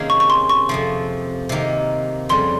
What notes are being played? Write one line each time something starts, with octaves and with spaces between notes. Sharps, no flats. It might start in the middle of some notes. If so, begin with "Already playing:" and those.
Already playing: C3 D#3 A#3 C#4 F4 G#4
C#6
C#6
C6
C#6
F2 C3 F3
C3 D#3 A#3
F2 C#3 G3 C6